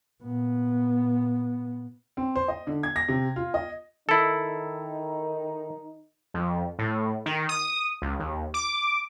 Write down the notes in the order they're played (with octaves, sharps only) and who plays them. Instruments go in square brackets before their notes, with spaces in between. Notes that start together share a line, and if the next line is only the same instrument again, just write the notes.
[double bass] A#2 B3
[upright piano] C4
C5
D#5
D3
G#6
A#6
C3
F4
D#5
[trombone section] D#3 D#4 [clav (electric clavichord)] E4 A4
[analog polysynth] F2
A2
D#3
D#6
C#2
D#2
D6